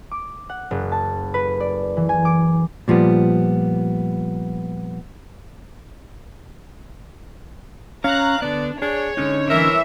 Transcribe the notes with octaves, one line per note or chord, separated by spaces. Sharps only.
D6
F#5
F#1
A5
B4
D5
E3
G#5
D6
A#2 F3 G3 B3
C#4 C#5 F5 A#5 F#6
D3 B3 D4 D5
D4 G#4 C#5
D3 G#3 C#4 D#4
E3 A#4 E5